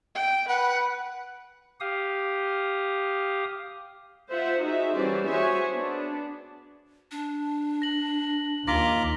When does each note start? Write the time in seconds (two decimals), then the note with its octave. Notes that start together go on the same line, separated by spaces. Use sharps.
0.15 G5
0.48 B4 F#5
1.80 G4 F5 D#6
4.31 F4 C5 E5 F#5
4.61 D#4 F#4 G#4 E5
4.95 E3 G3 C#4 F#4 C5 D5
5.28 F#4 G#4 C5 C#5 E5 G#5
5.73 B3 D4
7.11 D4
7.82 A#6 F#7
8.68 D#2 F4 A#5 D6 A#6 B6 G7